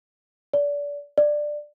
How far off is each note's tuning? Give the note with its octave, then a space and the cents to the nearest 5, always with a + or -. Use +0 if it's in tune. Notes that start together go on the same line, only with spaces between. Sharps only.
D5 -30
D5 +10